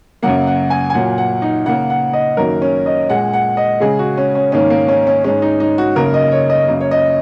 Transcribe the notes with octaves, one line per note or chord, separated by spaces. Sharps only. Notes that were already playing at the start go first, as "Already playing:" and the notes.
F#2 C#3 F#3 A#3 F#5
F#5
G#5
G#5
A#2 F#3 A#3 F#5
F#5
D#4
C#3 A#3 F#5
F#5
D#5
F#2 D#3 F#3 A#3 A#4
C#4
D#5
A#2 G#3 F#5
F#5
D#5
C#3 G#3 G#4
F#4
C#4
C#4
G#2 D#3 A#3 C#4
A#3
C#4
C#4
G#2 G#3 C#4
D#4
D#4
F#4
F#2 C#3 A#3 A#4
D#5
C#5
D#5
F#2 C#3 A#3
C#5
D#5